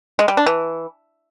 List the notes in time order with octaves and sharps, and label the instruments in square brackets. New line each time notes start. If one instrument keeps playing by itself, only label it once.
[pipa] G#3
G3
D4
E3